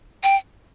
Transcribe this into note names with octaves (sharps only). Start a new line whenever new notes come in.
G5